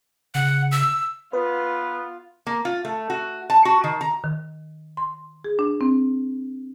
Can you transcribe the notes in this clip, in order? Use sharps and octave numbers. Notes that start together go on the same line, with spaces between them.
C#3 F#5
E6
B3 F4 B4
A#3
F4
A3
F#4
A5
F#4
D#3
A#5
D#3
C6
G#4
D4
C4